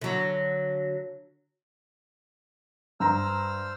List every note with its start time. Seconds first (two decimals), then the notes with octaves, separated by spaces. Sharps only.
0.01 D3 F#3
3.00 G2 C5 A#5 E6 F6